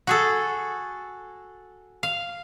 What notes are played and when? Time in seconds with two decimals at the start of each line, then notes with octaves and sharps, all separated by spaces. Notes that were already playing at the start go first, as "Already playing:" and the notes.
0.07 F#4 G#4 A4
2.03 F5